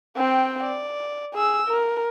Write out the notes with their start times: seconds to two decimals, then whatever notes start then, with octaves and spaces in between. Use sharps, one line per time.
0.17 C4 G5
0.63 D5
1.34 G#4 E6
1.67 A#4